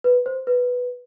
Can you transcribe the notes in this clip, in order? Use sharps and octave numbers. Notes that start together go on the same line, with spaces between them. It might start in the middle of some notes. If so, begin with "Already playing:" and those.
B4
C5
B4